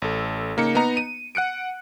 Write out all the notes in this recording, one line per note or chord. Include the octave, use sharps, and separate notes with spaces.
A1 A4
C#3 A#3 D#4 C#7
B3 D#4 D#5 A#5
D#7
F#5 F#6 C#7 D7